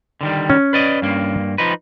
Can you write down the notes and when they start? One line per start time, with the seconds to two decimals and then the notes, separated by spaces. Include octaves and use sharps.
0.21 D3 D#3 G3
0.50 C#4
0.73 B4 D5 D#5
1.02 G2 A#3
1.58 F3 D#4 B4